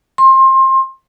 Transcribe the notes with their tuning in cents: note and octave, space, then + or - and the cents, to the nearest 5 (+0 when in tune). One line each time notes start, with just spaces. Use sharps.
C6 +25